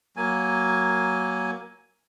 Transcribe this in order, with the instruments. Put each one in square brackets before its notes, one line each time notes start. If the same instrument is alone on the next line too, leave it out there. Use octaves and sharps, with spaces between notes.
[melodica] F#3 A#3 G#5